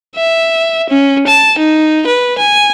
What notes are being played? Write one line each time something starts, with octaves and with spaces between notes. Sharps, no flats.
E5
C#4
A5
D#4
B4
G#5